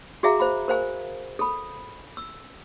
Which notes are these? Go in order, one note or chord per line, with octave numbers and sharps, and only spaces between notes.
F#4 G#4 E5 F5 A#5
C5 F5 B5
A#4 C5 F5 G#5
A4 B5
E6